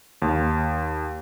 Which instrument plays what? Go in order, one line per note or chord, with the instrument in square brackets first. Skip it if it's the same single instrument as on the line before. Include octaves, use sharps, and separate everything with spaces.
[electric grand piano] D#2